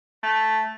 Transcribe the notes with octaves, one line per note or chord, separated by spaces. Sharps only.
A3